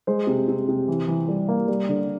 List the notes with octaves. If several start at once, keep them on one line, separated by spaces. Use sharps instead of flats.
G#3 C5
C3
C3
C3
E3
E3
G3
A#3
G3
D3